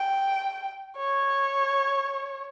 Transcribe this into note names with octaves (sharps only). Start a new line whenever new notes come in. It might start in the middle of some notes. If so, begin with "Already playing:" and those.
Already playing: G5
C#5